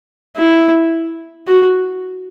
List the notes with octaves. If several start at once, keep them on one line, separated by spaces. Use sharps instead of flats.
E4
F#4